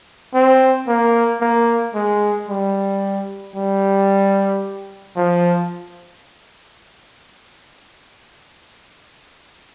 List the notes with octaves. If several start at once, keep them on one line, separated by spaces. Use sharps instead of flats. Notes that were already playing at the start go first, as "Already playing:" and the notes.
C4
A#3
A#3
G#3
G3
G3
F3